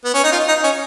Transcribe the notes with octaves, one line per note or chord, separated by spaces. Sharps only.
B3
C#4
D#4
F4
D#4
C#4